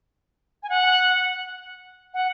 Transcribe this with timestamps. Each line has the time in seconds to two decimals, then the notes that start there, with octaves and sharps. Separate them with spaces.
0.63 G#5
0.69 F#5
2.14 F#5